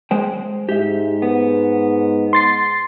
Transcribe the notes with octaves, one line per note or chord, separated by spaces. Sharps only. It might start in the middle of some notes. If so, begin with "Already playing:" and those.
G#3 C5 G5
G#2 G4 E5
B3
C6 A6 C7